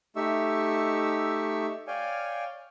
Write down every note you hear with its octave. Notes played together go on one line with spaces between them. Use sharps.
A3 D#4 G4 E5 C#6 E6
C#5 D5 F5 G5 G#5